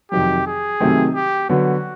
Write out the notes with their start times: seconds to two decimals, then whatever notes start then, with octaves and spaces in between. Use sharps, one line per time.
0.11 F2 C3 D#3 F#3 G4
0.46 G#4
0.80 C3 D#3 F#3 A3 C4
1.15 G4
1.49 D3 F#3 B3 F#4